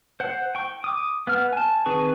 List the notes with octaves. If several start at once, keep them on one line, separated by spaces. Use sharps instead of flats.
C5 F#5
G5 C#6
D6 D#6
B3 F#5 F6
G#5 A5
D#3 C4 G#4 B4 C#6